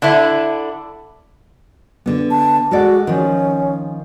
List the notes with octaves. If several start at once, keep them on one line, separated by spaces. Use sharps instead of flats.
D3 D4 E4
D3 B3
A5
G#3 F#4 A4 D5
D#3 F3 C#4